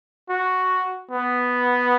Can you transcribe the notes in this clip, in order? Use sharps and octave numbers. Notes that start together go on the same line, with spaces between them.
F#4
B3